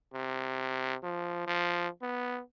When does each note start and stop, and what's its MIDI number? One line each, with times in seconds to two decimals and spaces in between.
0.14 0.96 48
1.03 1.47 53
1.47 1.88 53
2.02 2.40 59